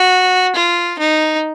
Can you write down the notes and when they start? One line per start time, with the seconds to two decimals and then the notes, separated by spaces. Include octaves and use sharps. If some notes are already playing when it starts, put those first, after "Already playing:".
Already playing: F#4
0.55 F4
0.98 D#4